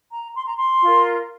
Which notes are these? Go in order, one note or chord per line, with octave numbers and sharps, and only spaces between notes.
A#5
C6
A#5
C6
F4 A#4